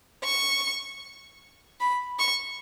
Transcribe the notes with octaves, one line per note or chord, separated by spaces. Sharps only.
C#6
B5
C#6